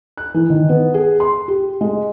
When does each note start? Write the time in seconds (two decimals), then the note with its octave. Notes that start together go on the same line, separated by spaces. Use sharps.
0.17 F#6
0.34 E3
0.50 D#3
0.69 B3
0.94 G#4
1.20 C6
1.48 G4
1.81 G#3